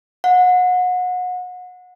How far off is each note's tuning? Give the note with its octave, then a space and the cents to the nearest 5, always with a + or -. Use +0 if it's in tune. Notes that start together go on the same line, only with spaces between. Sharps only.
F#5 -30